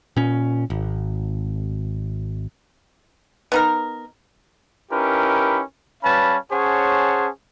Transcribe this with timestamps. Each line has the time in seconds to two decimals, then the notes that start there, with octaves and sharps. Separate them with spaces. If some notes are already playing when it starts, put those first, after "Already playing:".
0.17 A#2 C#4
0.70 G#1
3.52 B3 D#4 A#4
4.92 C#4 D#4 E4 G4 A#4 B4
6.04 G3 C#4 B4 F5 A5 B5
6.52 C#4 G#4 C5 C#5 F#5 A5